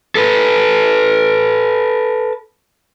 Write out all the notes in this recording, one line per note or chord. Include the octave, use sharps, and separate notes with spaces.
A4 B4